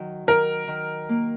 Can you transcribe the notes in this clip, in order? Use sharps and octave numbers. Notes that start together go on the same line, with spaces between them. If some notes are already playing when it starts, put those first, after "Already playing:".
Already playing: D#3 F#3
D#3 A#4
D#3
A#3